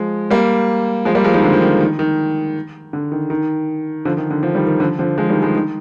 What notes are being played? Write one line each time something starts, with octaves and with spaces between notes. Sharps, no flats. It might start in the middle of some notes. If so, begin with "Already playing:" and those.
Already playing: F3 G#3
G3 A#3
F3 G#3
G3 A#3
F3 G#3
D#3 G3
D3 F3
F3
D#3
D#3
D#3
D3
D#3
D#3
D3 F3
D#3
D3
D3 F3
D#3 G3
D#3
D3 F3
D3 F3
F3 G#3
D#3 G3
F3 G#3
D#3